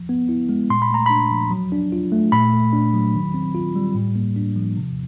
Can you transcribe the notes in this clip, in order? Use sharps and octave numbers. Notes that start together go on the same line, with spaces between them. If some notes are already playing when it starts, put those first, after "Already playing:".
Already playing: F3
B3
E4
G#3
A#2 C6
B5
A3 A#5
D4 B5
F3
F#3
D4
F4
A3
A#2 B5
A3
D4
F#3
D#3
C4
F4
G3
A2
A#3
D4
F3
C3